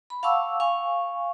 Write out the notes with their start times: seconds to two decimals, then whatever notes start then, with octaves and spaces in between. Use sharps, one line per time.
0.10 B5
0.23 F5 F#5 A5 C#6 D6 E6
0.60 F5 G#5 C#6